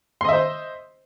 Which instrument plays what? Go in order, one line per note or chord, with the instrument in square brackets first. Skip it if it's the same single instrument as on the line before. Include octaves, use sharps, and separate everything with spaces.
[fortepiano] C6
D#5
E5
C5